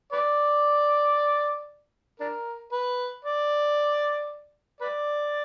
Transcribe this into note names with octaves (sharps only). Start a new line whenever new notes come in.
B4 D5
D4 A#4
B4
D5
B4 D5